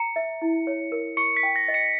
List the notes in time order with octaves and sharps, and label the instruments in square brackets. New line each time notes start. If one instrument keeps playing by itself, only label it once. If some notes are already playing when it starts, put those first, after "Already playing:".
Already playing: [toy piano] A#5 [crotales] C#7
[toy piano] E5
E4
C#5
A#4
[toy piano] C#6 [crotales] C#7
[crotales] B6
[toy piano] G5
[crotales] A#6
[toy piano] D#5
[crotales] C#7